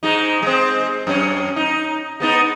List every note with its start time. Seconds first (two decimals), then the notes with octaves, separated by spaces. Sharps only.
0.03 G#2 G#3 D#4
0.42 G#3 C4
1.07 F#2 C#4
1.56 D#4
2.20 G#3 B3 D#4